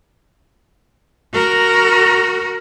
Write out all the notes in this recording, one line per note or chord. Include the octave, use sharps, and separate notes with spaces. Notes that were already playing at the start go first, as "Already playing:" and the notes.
F#4 A#4